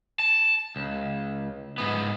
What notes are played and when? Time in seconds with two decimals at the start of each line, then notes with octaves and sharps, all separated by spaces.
0.19 A5
0.76 C#2
1.78 G#2 B3